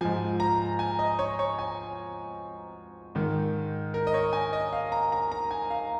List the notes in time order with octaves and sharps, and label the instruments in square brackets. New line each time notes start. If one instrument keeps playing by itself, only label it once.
[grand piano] G#2 F3 G#5
A#5
G#5
D#5
C#5
C#5
G#5
G#2 D#3
A#4
D#5
C#5
G#5
D#5
F5
A#5
A#5
A#5
G#5
F5